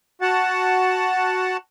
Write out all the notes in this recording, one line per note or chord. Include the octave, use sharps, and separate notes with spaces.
F#4 F#5 A5